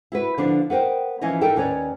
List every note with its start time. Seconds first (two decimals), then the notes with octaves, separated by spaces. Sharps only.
0.12 E4 F#4 B4
0.38 D3 F3 B3 D4
0.70 B3 A#4 C5 G5
1.21 E3 F3 C#4 E4 C#5 D#5
1.41 D#4 E4 A4 A#4 G5 A5
1.56 D#2 C#4 B4 C#5 D5